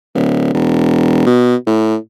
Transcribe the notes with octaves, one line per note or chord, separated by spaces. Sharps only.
D1
E1
B2
A2